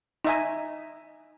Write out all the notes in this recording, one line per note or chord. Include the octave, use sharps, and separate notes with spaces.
D#4 E5 G#5